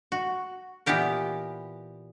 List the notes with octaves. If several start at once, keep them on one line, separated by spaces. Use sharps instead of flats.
F#4
A#2 E3 B3 G4 A#4